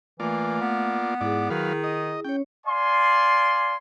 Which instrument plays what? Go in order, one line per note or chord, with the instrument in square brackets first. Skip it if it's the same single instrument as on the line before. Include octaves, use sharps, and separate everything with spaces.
[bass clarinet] E3 [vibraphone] A3 F5 [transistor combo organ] A#3 F4 D5
[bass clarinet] B3
[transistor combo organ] G#2 D5 [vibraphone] E4 G#4
[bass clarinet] D#3 [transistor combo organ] F#3 B4 F5
[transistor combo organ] D#5
[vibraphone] C#4 C#5 [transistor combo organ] G5
[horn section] D5 F5 G#5 C6